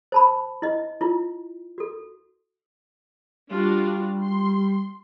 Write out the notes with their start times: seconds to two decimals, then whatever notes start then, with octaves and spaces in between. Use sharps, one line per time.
0.12 C5 A5 B5
0.62 E4 D#5
1.01 E4 F4
1.78 F#4 A4
3.51 G3 D4 F4 F#4
4.23 C6